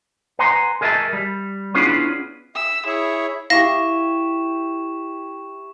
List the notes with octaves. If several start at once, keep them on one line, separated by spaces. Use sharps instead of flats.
B4 F#5 G#5 A#5 C6
G#4 A#4 D#5 E5 G5 A5
G3
B3 C#4 D4 E4 F4 G#4
E5 E6
E4 G#4 C#5 E5
E4 G4 F5 C#6 A#6 E7